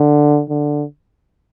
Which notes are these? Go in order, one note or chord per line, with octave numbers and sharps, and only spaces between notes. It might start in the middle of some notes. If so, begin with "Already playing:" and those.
Already playing: D3
D3